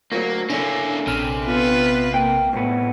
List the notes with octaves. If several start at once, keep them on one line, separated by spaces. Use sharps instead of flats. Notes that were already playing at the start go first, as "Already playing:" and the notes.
D2 F#3 A#3
D3 A#3 C#4 D4 E4
A#1 C3 F6
B3 F4 B4
A#3 G5
C2 A2 B3